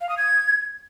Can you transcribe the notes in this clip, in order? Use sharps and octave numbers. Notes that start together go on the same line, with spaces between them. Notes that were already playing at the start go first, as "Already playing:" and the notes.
F5
D#6
G#6